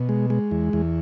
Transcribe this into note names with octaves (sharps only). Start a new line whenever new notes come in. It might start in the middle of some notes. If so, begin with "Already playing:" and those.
Already playing: B2
G#3
G#3
E2
E2